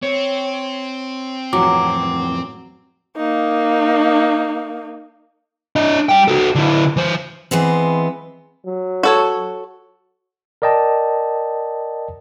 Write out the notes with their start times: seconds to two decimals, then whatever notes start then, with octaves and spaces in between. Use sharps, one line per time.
0.03 C4 C#5
1.53 F2 A2 E3 F#3 D6
3.17 A#3 D#4
5.76 D4 D#5
6.09 G3 G5
6.28 F#4 A4
6.55 D3 E4
6.97 E3 C5
7.51 E3 G#3 B3 C4
8.65 F#3
9.03 F#4 A4 C#5
10.62 A#4 D5 D#5 G5 A5